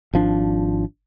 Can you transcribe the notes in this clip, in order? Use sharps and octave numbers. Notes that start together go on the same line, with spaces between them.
G#1 F3 D4